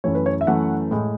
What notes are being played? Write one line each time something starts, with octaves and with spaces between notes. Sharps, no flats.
F#2 E3 A3 C#5
B4
C#5
E5
F#2 E3 A3 F#5
A2 G#3